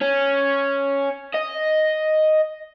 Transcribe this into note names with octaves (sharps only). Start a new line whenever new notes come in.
C#4
D#5